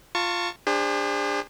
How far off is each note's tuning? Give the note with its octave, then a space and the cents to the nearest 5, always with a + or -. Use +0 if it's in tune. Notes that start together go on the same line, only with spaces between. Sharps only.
F4 +0 A5 +35 C#6 +0
D4 +0 G#4 -45 C5 +0